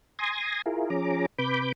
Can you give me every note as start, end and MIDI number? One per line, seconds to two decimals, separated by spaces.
0.19 0.62 80
0.19 0.62 84
0.19 0.62 87
0.19 0.62 92
0.19 0.62 94
0.66 0.89 64
0.66 0.89 65
0.66 0.89 68
0.66 0.89 70
0.90 1.26 53
0.90 1.26 61
0.90 1.26 68
0.90 1.26 82
0.90 1.26 86
1.39 1.72 48
1.39 1.72 71
1.39 1.72 83
1.39 1.72 86
1.39 1.72 91